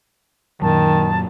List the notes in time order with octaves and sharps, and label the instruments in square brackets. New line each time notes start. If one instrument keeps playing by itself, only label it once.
[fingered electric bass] F#2 A#2 F#3 [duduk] D#3 [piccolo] A5